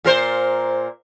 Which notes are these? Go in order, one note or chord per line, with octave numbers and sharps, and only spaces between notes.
A#2 A#4 C5